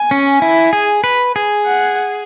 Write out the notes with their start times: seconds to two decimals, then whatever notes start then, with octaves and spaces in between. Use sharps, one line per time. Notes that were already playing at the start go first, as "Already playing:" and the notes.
Already playing: G#5
0.11 C#4
0.42 E4
0.73 G#4
1.04 B4
1.36 G#4
1.66 F#5